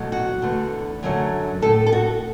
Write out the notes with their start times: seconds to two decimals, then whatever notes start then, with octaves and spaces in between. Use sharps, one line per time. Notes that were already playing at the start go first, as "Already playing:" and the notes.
Already playing: E2 B2 F#3 A3
0.12 F#4
0.42 E2 D3 A3
1.03 F#2 D3 F#3 A3
1.62 A2 A3 A4
1.87 A4
1.92 F#4